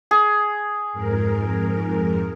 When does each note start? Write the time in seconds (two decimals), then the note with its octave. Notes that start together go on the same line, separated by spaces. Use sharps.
0.11 G#4
0.93 F2 G#2 A#4